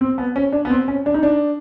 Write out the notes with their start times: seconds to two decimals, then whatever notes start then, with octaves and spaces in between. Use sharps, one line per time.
0.01 C4
0.18 B3
0.36 C#4
0.52 D4
0.65 B3
0.70 C4
0.88 C#4
1.06 D4
1.14 D#4
1.23 D4